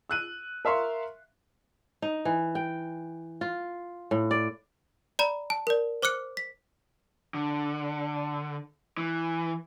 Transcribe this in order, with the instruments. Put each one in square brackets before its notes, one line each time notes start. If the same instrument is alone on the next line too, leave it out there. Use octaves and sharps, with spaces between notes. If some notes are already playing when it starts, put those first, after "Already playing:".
[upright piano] E6 F#6 D#7
A#4 E5 F5 C6 C#6
[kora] D#4
E3
G5
F4
A2
D5
[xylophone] D5 A#5 B5
A5
A#4 D5
C5 D6 F6 F#6 C#7
B6
[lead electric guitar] D3
E3